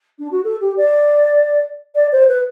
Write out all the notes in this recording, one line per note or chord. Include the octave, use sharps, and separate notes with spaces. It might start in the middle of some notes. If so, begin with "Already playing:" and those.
D4
F#4
A4
G4
D5
D5
C5
B4